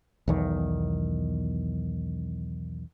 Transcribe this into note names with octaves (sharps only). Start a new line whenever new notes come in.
B1 E2 D#3